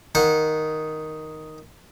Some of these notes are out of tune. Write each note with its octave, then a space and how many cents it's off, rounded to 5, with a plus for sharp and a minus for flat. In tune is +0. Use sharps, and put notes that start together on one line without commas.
D#3 +0 F#5 -25